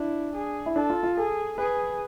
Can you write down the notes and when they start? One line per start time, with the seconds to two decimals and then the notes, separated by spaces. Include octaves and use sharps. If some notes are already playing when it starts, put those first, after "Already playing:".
Already playing: D4 E4
0.35 G#4
0.66 E4
0.76 D4 A4
0.90 F4
1.03 F4
1.17 G#4 A4
1.58 G#4 B4